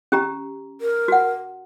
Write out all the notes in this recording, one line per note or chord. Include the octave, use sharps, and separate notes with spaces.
C#4 G4 A#5
A#4
F#4 F#5